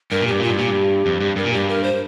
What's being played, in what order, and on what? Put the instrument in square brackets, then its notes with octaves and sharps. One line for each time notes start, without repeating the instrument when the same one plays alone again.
[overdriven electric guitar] G2 [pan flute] A#4
[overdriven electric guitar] A#2
[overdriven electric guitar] G2 [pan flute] G4
[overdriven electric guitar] A#2 [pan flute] F4
[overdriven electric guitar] G2
[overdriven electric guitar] A#2 [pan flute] G4
[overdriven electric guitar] G2
F2
G2
[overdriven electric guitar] G2 [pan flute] A#4
[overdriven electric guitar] A#2
[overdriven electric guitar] G2 [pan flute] G4
[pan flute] A#4
C5